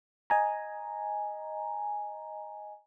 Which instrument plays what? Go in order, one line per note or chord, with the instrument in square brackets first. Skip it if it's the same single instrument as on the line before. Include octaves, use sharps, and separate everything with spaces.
[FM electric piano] D#5 G#5 A#5